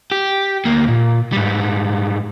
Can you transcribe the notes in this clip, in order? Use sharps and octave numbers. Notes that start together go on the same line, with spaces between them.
G4
D2 A#3
A#2
G#2 G3